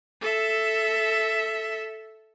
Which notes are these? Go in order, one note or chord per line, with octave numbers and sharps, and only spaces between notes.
A4 E5